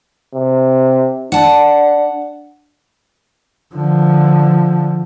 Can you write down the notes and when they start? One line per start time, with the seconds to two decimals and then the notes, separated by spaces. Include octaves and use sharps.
0.34 C3
1.32 D4 F#5 A5
3.75 D3 F3